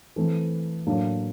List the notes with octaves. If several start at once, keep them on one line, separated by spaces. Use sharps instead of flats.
E3 A3 C4
A2 F#3 A#3 D4